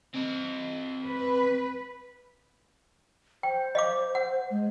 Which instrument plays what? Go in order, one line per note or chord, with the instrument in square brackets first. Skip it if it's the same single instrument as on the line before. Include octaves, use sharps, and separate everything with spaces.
[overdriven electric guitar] C4 D#5
[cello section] B4
[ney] C5 [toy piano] G5
[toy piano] D#5 F5 D6
F#5
[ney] G#3